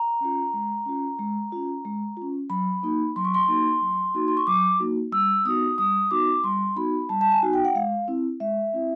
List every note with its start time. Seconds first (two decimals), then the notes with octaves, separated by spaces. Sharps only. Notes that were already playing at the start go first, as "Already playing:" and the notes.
Already playing: A#5
0.21 C#4 F4
0.54 G#3
0.86 C#4 F4
1.19 G#3
1.52 C#4 F4
1.85 G#3
2.17 C#4 F4
2.50 F#3 B5
2.83 A#3 D#4 F#4
3.16 F#3 C6
3.25 C#6
3.34 C6
3.48 A#3 D#4 F#4
3.81 F#3
4.14 A#3 D#4 F#4
4.28 C6
4.37 C#6
4.47 F#3 D6
4.80 A#3 D#4 F#4
5.12 G3 E6
5.45 B3 D#4 F#4 D#6
5.78 G3 D#6
6.11 B3 D#4 F#4 D6
6.44 G3 C6
6.76 B3 D#4 F#4 B5
7.09 G3 A5
7.21 A5
7.31 G#5
7.42 B3 D#4 F#4
7.53 G5
7.65 F#5
7.75 G#3 F5
8.08 C4 E4
8.40 G#3 E5
8.73 C4 E4